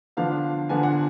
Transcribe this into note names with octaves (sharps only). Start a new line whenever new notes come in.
D3 F3 B3 D4 F5
D3 F3 B3 D4 G#5
F#5